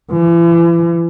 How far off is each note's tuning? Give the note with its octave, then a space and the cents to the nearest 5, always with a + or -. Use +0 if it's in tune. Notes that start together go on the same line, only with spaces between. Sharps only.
E3 +40